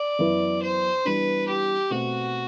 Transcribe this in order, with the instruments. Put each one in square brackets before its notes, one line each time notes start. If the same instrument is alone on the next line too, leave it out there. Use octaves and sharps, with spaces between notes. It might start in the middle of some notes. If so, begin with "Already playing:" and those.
Already playing: [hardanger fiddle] D5
[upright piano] F#2 E3 B3 E4 B4
[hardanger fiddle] C5
[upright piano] E3 G3 B3 D4 [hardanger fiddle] B4
[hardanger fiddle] G4
[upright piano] B2 A3 C4 [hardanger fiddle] F#4